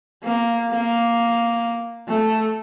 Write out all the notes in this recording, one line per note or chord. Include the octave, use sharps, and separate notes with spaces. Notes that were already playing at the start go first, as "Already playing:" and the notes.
A#3
A#3
A3